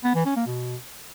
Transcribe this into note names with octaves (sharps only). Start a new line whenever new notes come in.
B3
E3
C#4
A#3
B2